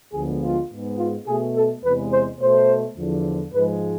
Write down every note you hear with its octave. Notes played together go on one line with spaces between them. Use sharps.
D2 D3 F3 G#3 B3 G#4
F4
G#2 G#3 B3
F4
B2 A3 G#4
A4
E2 C3 G#3 B4
C5
B2 A3 C5
E2 D3 F3
G#2 F3 G#3 B4